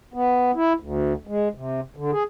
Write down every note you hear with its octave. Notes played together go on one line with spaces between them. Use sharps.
B3
E4
D2
G#3
C3
D3
G#4